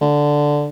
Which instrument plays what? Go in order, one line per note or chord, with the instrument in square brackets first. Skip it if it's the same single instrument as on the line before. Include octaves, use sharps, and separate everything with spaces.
[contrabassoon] D3